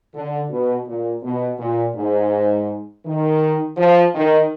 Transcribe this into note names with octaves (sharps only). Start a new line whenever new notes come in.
D3
B2
A#2
B2
A#2
G#2
D#3
F3
D#3